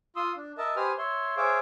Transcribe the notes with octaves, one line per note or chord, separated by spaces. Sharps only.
F4 C6 D#6 E6
D4
A#4 D#5 E5 A5
G4 B4 C5 G#5 D#6 F6
C#5 E5 C6
G#4 C5 C#5 E5 F5 D6